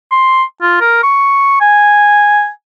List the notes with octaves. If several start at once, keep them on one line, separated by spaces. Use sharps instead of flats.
C6
F4
A#4
C#6
G#5